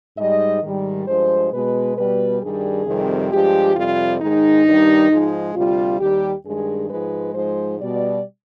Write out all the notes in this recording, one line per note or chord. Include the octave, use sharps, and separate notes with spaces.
G#2 G3 D#5
G#2 D#3 G3
G2 F3 G#3 C5
B2 G#3 B4
B2 G3 B4
G2 D#3 G3 G#4
F2 C3 D#3 G3
G2 F3 G#3 G4
F2 C3 G3 F4
G#2 D#3 G#3 D#4
G2 D#3 G3
G#2 F3 G#3
D2 C3 G3 F4
D#2 D#3 G3 G4
G2 D#3 G#3 G#4
G#2 F3 G#3 B4
G#2 F3 G#3 C5
B2 G3 D5